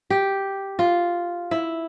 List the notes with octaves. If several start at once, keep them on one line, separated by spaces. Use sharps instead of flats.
G4
F4
E4